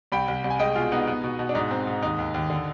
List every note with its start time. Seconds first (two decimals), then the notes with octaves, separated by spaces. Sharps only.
0.12 C2 G5 B5
0.28 C2
0.44 C2
0.50 G#5
0.59 G#3 D#5 G5
0.75 B2 F4 G#4
0.92 B3 D#4
1.07 B3
1.24 B2
1.39 B2
1.49 D4
1.55 G#2 D#4
1.71 C4
1.87 G#2
2.03 D#2 D#4
2.19 D#2
2.34 D#2
2.50 D3